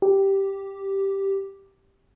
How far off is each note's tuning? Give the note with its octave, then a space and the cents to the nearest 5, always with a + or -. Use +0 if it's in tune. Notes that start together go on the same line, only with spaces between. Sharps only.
G4 -5